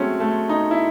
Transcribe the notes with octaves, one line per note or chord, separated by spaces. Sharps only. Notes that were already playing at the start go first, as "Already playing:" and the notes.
Already playing: F#3 G#3 A3 C4 C#4
A3
D#4
E4